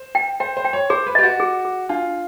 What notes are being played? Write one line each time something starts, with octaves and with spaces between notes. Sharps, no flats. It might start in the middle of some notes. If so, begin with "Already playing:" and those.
Already playing: C5
G5
C5 G5
C5
G5
C#5
G#4 C5
B4
G4 D#5
F#4
G#4
G#4
D4 F4